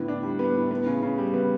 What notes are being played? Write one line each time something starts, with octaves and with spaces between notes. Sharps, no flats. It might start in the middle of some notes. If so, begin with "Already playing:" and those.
Already playing: A2 D3 B3
D4
G3
B3
A2
B3
C#3
C#3
G3
B3